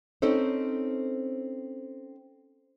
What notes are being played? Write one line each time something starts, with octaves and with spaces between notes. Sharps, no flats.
C4 C#4 D#4 A4 C5